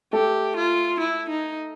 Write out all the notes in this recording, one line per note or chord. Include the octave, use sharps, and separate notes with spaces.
A3 G4 A4
F4
E4
D#4